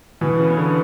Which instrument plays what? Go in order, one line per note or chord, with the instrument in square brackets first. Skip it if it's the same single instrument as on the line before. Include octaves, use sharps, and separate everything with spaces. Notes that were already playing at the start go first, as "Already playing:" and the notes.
[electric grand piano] B2 [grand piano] E3
[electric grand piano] C#3
[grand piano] B3
[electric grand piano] D3